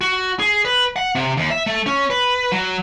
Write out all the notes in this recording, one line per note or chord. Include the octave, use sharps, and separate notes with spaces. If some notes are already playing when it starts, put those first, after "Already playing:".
F#4
G#4
B4
F#5
C3
D#2
E5
A3
C#4
B4
F#3